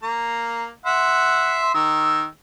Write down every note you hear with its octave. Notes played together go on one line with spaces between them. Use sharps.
A#3 A#5
E5 F#5 C6
D#3 E6